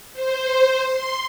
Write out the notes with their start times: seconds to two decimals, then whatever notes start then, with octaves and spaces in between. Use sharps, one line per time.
0.13 C5
0.84 C6